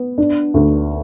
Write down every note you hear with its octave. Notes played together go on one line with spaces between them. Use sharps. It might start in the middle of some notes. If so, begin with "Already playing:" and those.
Already playing: B3
D4
D2